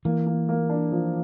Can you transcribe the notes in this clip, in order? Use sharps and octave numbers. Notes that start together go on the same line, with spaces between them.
E3 A#3
A#3
A#3
D4
F3